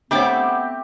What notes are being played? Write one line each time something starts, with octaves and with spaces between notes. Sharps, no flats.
A3 B3 C4 D4 G4 C#5 D6